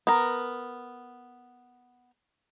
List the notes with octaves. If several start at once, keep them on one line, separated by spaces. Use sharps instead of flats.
B3 A#4